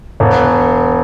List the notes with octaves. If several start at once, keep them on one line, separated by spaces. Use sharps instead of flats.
E1